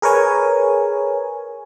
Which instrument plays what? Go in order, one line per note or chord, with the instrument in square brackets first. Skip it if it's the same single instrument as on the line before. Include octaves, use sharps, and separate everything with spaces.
[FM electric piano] G#4 A#4 B4 C#5 G#5